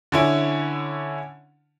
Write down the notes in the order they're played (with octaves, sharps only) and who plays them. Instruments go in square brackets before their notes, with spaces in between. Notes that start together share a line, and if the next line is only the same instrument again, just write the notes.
[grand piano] D3 C#4 E4